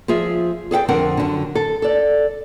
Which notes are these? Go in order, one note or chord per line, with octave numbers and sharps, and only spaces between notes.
F3 F4 G#4 E5
G#4 A4 F#5 G5
F2 D3 C4 A#4 F#5
F#2 D3
A4
A4 D5